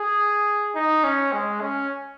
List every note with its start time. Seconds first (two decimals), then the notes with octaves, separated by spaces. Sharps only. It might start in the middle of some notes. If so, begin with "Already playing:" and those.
Already playing: G#4
0.75 D#4
1.04 C#4
1.33 G#3
1.61 C#4